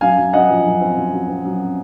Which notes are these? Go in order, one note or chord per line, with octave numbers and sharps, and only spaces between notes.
F#2 F5 G#5
F#2
F#2 D#5 F#5
F3
F#2
C4
F#2
F#2
C4
F#2